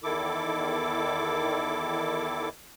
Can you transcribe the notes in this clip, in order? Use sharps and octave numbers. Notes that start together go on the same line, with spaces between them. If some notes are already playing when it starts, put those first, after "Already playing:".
E2 D#3 E4 A4 D6